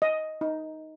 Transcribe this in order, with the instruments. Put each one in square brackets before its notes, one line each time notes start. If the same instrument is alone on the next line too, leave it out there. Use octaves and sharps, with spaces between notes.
[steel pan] D#5
D#4